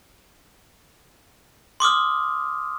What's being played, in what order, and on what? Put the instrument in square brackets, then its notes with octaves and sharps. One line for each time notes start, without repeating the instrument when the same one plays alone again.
[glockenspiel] C6 D6 D#6 F6